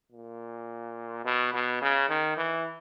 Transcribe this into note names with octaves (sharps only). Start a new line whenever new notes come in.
A#2
B2
B2
C#3
D#3
E3